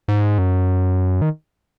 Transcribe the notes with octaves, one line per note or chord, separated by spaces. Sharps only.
G#2
F#2
D#3